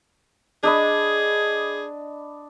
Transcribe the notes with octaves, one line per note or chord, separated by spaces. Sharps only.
D4 G#4 D#5 B5